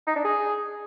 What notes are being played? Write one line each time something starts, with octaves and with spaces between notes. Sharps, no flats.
D#4
D4
G#4